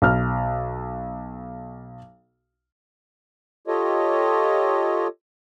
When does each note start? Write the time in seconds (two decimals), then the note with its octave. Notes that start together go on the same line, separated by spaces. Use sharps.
0.02 B1 F6
3.67 F4 G4 A4 C#5 D#5